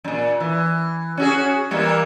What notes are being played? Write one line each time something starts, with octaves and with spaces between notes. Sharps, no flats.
F#2 A#2
E3
C#4 F#4 G#4
E3 G3 A#3